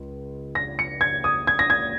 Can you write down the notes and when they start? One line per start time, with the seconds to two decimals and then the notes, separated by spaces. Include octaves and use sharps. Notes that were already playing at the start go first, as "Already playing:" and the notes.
Already playing: C#2
0.55 A#6
0.79 C#7
1.01 G#6
1.24 D#6
1.47 G#6
1.59 A#6
1.70 G#6